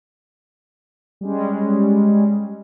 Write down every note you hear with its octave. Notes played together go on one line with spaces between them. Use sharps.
G3 G#3 C#4